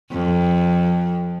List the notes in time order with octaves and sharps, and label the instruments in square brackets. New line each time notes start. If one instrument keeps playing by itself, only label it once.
[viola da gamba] F2